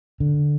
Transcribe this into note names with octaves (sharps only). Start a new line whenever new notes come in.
D3